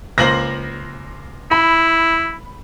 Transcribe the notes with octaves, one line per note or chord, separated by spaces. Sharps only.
C#2 A#3 C5 A#6 F#7
E4 B5